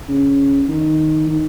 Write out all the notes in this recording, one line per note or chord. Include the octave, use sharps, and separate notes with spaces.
C#3
D#3
D#3